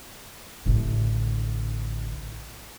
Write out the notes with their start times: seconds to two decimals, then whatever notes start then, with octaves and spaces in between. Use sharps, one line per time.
0.66 A1 D3